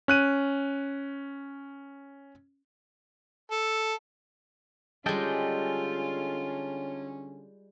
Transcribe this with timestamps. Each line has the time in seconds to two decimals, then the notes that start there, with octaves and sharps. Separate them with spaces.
0.08 C#4 F#6 D#7
3.51 A4
5.06 D3 G3 G#3 C#4 F4 A4 D#5 G5